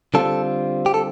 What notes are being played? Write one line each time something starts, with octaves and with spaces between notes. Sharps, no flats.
D3 G3 C4 F4 A4
G4
A4